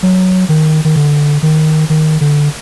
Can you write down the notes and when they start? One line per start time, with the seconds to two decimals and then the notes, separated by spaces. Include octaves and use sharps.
0.03 F#3
0.49 D#3
0.85 D#3
0.96 D3
1.43 D#3
1.90 D#3
2.21 D3